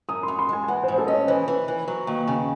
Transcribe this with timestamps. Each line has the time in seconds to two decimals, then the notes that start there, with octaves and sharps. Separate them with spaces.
0.09 F#2 D#6
0.23 F#2 C6
0.39 C6
0.49 G#3 G#5
0.64 G#5
0.68 E3 F#5
0.83 C5
0.88 G#2
0.94 C5
0.98 A4
1.07 C#4 D#5
1.13 C#5
1.28 E3 C5
1.48 E3
1.68 E3
1.88 F#3
2.07 D#2
2.28 C#3